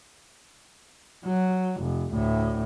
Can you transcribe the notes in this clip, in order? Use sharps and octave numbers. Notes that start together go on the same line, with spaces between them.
F#3
F1
D2 A2